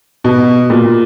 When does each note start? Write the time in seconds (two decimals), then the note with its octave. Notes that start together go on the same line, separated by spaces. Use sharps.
0.24 B2
0.70 A#2